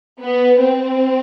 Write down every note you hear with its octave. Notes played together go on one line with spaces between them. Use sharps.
B3
C4